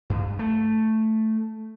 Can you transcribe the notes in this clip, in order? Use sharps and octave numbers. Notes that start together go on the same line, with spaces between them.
G2
A3